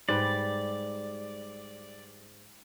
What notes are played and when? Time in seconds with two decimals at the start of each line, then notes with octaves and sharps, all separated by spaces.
0.09 G#2 G3 B4 D5